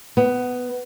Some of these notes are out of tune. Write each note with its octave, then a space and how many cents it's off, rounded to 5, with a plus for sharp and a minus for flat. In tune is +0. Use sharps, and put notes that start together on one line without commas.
B3 +10